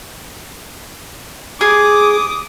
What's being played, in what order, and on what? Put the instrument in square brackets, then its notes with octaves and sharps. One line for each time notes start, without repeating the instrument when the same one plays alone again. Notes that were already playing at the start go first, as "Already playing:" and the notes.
[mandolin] G#4 [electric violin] D6 D#6